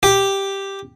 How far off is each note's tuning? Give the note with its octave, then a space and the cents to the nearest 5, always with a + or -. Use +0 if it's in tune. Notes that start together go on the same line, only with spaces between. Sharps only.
G4 +0